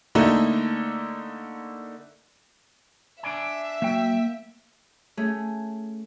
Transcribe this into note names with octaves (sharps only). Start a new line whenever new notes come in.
D3 A3 A#3 D#4 E4
D4 D5 E5 G#5
F#3 A#3 G5
A3 C#4 G#4